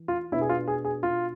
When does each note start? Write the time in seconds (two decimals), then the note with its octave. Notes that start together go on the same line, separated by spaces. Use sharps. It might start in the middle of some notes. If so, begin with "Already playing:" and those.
Already playing: E3
0.08 F4
0.32 B2 B3 D4 E4
0.41 G#4
0.49 F4
0.68 G#4
0.85 G#4
1.03 F4